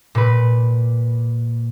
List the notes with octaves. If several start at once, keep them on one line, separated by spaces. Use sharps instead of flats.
A#2 B4